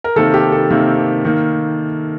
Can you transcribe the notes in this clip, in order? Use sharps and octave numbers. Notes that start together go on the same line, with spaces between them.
A#4
C3 D#3 A#3 A4
G4
A4
C3 D#3 A#3
D#3 A#3